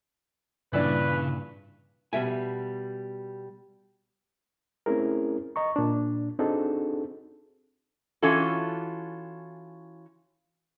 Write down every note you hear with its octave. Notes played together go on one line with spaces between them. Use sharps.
G2 A#2 C#3 E3 D4 B4
B2 G3 E5 G#5
A3 C4 C#4 E4 G#4 A#4
D#5 A#5 C#6
A#2 D4
C4 D4 D#4 F#4 G#4 A4
E3 C#4 F4 F#4 A4